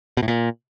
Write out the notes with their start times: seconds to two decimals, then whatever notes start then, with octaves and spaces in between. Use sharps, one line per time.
0.17 B2
0.23 A2
0.28 A#2